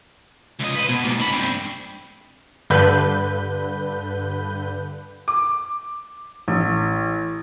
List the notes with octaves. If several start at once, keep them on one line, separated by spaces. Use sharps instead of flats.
C#2 D#5
B4 C5
B2
G#2 A#3
C#2 B5
C4 D4
G2 D3 B4 G6
D6
A1